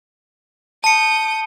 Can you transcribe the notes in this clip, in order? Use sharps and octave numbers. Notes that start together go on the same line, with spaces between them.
A5 D#6 G6 C#7